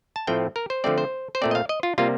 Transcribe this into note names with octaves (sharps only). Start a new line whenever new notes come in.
A5
A2 F3 A3 C4 G5
A#4
C5
D3 F3 A3 C4 D5
C5
C5
A#2 A3 C4 D5
D#5
F5
D#5
F4
C3 G3 A#3 F4